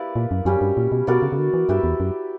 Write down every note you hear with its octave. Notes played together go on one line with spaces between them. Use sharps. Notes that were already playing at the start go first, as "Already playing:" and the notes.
Already playing: A#3 E4 G4 B4 D5
A#2
F#2
F#2 G3 C#4 G4
G2
A#2
B2
B2 B3 F#4 A#4 D5
C#3
C#3
D3
E3
G2 E4 G4 B4 E5
E2
F#2